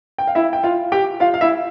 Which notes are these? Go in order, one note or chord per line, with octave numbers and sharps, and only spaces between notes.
G5
F5
E4 E5
G5
F4 F5
G4 G5
F4 F5
F5
E4 E5